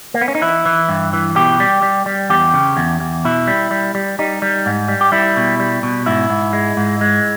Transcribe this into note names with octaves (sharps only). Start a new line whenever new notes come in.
A#3
B3
C#4
D#4
E3 E4
E3
G2
E3
B2 G4
G3
G3
G3
E2 G4
C#3
E2
E2
B2 E4
G3
G3
G3
G3 D#4
G3
G#2
G3
G4
G3 E4
B2
G3
B2
G#2 E4
G#2
G#3
G#2
G#3